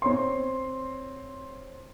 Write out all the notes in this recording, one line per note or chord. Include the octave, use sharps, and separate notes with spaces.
C4 C#5 C6